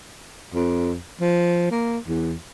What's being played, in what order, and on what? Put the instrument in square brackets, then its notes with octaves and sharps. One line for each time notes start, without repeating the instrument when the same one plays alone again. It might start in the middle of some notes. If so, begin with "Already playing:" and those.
[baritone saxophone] F2
F3
A#3
E2